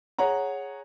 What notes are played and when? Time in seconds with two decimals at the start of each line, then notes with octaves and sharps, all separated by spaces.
0.19 G#4 C#5 F#5 A#5